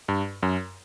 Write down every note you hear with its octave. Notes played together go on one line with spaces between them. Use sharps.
G2
F#2